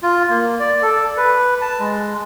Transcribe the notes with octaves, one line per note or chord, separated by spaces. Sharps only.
F4
A#3
D5
A4
B4
A5
G#3